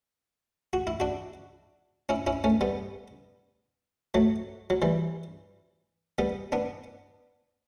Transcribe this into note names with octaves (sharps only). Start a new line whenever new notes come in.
F#4
E4
D4 F#4
C#4 E4
C#4 E4
A3 C#4
G3 B3
F#3 A3
F#3
E3 G3
G3 B3
B3 D4